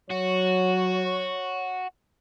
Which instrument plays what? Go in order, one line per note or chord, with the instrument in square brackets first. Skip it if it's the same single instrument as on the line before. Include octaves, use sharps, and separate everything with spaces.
[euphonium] F#3 [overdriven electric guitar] F#4 [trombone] C#5